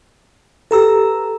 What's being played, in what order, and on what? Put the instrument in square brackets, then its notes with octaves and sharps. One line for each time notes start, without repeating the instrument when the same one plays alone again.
[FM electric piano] G4 A4 [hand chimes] B4 A#5 E6